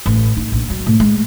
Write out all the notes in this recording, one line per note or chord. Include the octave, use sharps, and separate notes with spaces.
A1
D#4
A#1
F#3
A2
G#3